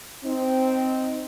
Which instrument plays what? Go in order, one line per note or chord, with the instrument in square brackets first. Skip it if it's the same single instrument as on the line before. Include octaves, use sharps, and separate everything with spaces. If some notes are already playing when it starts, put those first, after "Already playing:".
[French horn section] C4 D#4